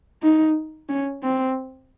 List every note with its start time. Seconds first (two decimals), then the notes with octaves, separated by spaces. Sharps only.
0.23 D#4
0.89 C#4
1.23 C4